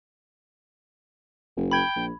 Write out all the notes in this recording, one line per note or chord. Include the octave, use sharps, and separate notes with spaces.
F#1
G5 B5 G#6
A#1